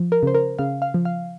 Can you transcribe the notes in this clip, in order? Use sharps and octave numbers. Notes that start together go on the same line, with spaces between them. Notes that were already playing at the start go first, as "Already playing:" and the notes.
Already playing: F3
A#4
C#3 C5
A#4
C#3 F5
F5
F3
F5